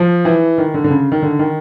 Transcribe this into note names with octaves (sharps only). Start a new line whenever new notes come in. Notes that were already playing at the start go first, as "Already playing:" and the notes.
Already playing: F3
E3
D#3
D3
D3
C#3
D#3
D3
D#3